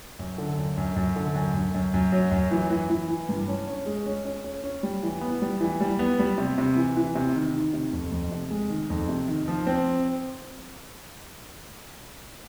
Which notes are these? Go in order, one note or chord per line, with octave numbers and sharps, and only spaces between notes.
F#2
D3
F#2
F#2
F#2
D3
F#2
F#2
F#2
F#2
F#3
F#2
E3
E3
E3
E3
G2
C#4
C#4
G#3
C#4
C#4
C#4
C#4
G3
E3
B3
G3
E3
G3
B3
G3
C3
C3
E3
E3
C3
D#3
D#3
C3
F2
F2
C3
G#3
D#3
F2
C3
D#3
F3
C4